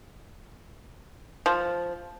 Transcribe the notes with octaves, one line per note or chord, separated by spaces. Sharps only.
F3